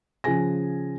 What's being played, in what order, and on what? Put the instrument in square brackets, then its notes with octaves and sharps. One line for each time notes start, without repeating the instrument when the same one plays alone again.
[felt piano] C#3 F3 G#4 G#5 A#6